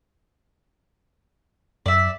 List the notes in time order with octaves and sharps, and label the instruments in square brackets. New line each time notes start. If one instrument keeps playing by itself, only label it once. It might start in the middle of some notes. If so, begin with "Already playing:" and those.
[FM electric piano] F#2 [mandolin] D5 E5